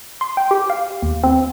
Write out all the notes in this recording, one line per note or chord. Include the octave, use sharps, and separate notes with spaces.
C6
G5
G4
F5
D#2
C4